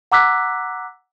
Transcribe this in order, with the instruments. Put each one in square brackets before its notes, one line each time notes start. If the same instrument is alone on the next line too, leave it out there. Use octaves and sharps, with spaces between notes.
[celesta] F#5 A#5 D6 E6 F#6 B6